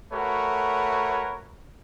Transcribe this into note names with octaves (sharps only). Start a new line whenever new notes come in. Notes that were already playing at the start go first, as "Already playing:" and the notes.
A3 F#4 A#4 B4 C#5